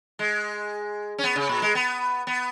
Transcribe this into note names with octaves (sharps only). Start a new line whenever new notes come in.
G#3
C#4
B3
C#3
A#2
G#3
B3
B3